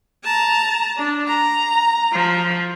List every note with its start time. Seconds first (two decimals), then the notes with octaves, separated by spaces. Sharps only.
0.24 A5 A#5
0.97 D4
1.27 A#5
2.12 F3